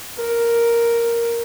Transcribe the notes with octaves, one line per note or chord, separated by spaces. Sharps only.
A#4